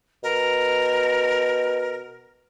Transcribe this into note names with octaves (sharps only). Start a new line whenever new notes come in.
B2 A#4